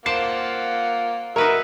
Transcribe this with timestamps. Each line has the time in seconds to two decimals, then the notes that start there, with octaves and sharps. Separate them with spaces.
0.06 A#3 F4 C5 D5 F#5 A5 C7
1.36 D#4 F#4 A#4 B4 C#5 E5